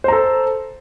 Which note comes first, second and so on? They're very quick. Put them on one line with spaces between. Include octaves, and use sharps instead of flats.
C5 A#5 A4